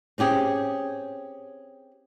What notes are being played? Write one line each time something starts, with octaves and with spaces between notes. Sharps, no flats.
C4 C#4 G4 G#4